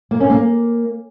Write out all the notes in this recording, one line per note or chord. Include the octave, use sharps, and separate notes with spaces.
A#3
C#4
A#3